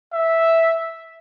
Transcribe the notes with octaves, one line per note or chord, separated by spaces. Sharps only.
E5